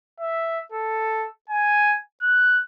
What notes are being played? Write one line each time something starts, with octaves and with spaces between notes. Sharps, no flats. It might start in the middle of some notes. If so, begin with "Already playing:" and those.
E5
A4
G#5
F#6